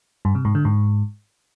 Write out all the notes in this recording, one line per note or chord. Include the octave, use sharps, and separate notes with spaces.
G2
C3
G#2
D3
G#2